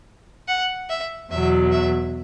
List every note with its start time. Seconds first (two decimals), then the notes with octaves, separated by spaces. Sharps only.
0.48 F#5
0.89 E5
1.31 E2 B2 F#3 E5
1.72 E5